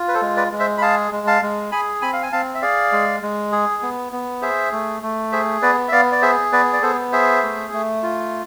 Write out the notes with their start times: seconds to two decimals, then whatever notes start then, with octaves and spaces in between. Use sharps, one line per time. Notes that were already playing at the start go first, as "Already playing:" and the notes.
Already playing: F4
0.08 B4
0.14 A4 C5
0.22 G#3
0.37 B4 D5
0.52 G#3
0.59 C5 E5
0.78 B5
0.82 G#4 F5 A5
1.12 G#3
1.27 F5 A5
1.42 G#3
1.72 G#4 G#5 B5
2.02 C4 G#5 B5
2.13 F5
2.23 G#5
2.32 C4 F5 A5
2.55 E5
2.62 G#4 D5 F5
2.92 G#3
3.22 G#3
3.52 G#4
3.82 B3
4.12 B3
4.42 G#4 C5 E5
4.72 A3
5.03 A3
5.32 G#4 C5 E5
5.62 B3 B4 D5
5.88 E5
5.92 B3 D5 F5
6.12 D5
6.22 G#4 C5 E5
6.52 B3 B4 D5
6.73 D5
6.82 B3 A4 C5
7.12 G#4 C5 E5
7.43 A3
7.73 A3
8.03 F4